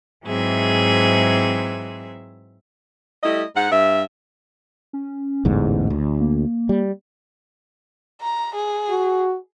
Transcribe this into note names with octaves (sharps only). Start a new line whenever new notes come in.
G#2 E3 F#3 C4 G#4 E5
G3 A3 E4 D#5
G#2 F#5
G2 E5
C#4
A1 E2 G#2 D3
D2
A#3
G3
A#5
G#4
F#4